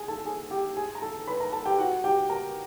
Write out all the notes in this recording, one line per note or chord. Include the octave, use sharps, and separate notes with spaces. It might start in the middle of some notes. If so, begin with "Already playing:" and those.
Already playing: G#4 G#5
A4 A5
G#4 G#5
G4 G5
G#4 G#5
A#5
A4 A5
B4 B5
A#4 A#5
A4 A5
G4 G5
F#4 F#5
G4 G5
A#4 A#5